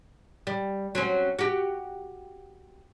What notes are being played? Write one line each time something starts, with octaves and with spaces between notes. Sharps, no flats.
G3
F#3 C4 C#4
F#4 G4